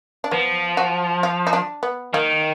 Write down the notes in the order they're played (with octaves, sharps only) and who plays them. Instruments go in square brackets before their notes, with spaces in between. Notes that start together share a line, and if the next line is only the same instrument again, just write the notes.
[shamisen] D4
[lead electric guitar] F3 [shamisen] B3
[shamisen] F#4
F4
D#4
D4
B3
[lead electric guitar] D#3 [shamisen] A#3